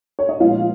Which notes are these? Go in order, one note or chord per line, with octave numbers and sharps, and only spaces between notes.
C#5
D#5
A#2 F3 G#3 B3 F4 F5